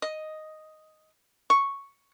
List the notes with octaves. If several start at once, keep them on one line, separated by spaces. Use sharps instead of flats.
D#5
C#6